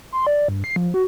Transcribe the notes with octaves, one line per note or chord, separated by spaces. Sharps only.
C6
D5
G2
C7
F3
F#4